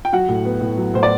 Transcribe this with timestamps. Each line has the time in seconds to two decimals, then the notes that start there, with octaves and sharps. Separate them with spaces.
0.05 G5
0.13 F#3 F#4 F#5
0.29 A2
0.45 B3
0.61 A2
0.77 F#3
0.94 A2 C5
1.03 D5